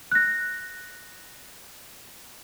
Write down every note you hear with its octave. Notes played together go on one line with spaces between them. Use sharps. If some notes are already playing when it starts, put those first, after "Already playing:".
F#6 A#6